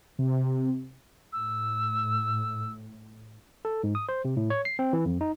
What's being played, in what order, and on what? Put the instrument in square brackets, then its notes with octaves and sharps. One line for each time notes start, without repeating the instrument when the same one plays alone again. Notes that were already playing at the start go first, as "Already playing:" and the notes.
[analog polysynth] C3
[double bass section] A2 [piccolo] E6
[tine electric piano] A4
G#2
D#6
C5
C3
A2
C#5
C7
C4
E3
F2
D#4